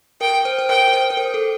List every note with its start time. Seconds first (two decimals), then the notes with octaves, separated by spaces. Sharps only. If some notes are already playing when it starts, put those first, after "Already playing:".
0.21 A#4 G5
0.45 C5
0.59 C5
0.69 A#4 G5
0.88 A#4
0.93 C5
1.10 C5
1.17 A#4
1.34 A4